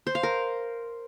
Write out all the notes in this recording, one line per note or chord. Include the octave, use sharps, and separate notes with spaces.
C5
F5
A#4